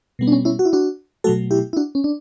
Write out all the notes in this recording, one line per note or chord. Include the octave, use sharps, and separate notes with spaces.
B2 G3 B3
D4
C#4
C#4 E4
F#4
E4
D4 F#4
B2 F#3 A3 F#4 A4
E4 G4
E4
D4 F#4
C#4
D4